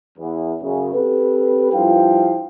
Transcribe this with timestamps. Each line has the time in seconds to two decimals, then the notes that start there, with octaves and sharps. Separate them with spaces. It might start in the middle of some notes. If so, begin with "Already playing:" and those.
0.18 E2
0.62 F#2 C#3
0.93 C4 G4 A4 B4
1.73 G2 F3 E4 F4 F5 G5